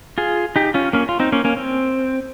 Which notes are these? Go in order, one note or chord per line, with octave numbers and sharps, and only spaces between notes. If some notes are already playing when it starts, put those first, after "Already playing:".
F4 G#4
D#4 G4
C#4 F4
A#3 C#4
F4
C4 D#4
A#3 C#4
A#3 C#4
C4